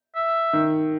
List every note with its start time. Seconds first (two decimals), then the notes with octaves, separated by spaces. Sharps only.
0.16 E5
0.53 D#3